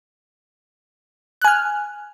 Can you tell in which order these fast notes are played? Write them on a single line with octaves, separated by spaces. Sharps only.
F#6 G#5 F6